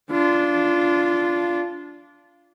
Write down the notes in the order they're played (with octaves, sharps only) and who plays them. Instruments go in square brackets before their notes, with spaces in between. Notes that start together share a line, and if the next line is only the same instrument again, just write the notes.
[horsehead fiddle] D4 F4